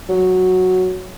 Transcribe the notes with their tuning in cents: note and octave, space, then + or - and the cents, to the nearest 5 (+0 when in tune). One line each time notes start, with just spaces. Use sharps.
F#3 -5